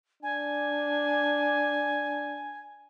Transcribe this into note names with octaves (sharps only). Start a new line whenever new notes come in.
D4 G#5